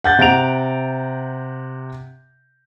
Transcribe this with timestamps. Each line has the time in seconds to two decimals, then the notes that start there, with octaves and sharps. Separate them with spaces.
0.04 F#5 G6 A6
0.19 C3 F#5 A#5 D7 F7